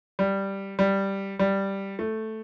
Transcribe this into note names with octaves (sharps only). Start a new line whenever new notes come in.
G3
G3
G3
A3